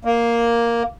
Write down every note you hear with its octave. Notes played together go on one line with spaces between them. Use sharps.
A#3